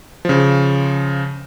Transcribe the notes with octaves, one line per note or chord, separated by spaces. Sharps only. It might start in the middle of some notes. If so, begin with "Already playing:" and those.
C#3 F3